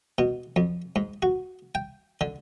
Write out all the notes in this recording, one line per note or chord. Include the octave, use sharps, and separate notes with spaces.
B2
F2
G#2
F#4
G5
D3